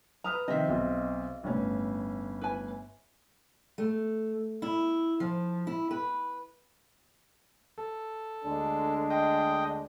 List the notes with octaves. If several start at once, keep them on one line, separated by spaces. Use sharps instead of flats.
B4 A#5 D#6 F6
D#3 F3 C4 D#5 E5
B1 C4
G1 A2 C#4
B4 G#5
A3
E4
F3
E4
B4
A4
D2 G#3 D4
D#5 G5